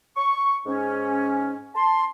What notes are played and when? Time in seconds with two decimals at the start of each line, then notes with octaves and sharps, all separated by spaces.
0.17 C#6
0.66 G#2 C#4
1.75 A5 C6